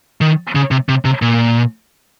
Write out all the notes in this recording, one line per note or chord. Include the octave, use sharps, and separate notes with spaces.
D#3
C#3
C3
C3
C3
A#2